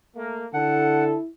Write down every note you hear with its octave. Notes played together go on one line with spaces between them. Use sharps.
A3 A#3
D3 E4 A4 F#5